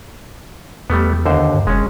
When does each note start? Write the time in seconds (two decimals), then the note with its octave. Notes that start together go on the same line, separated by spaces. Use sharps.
0.90 E2 G3 A3 B3
1.25 D#2 D3 C5
1.54 G2
1.67 F1 G#3 C#4